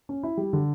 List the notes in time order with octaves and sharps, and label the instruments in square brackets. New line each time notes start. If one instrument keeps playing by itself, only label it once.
[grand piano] C#4
E4
G3
D3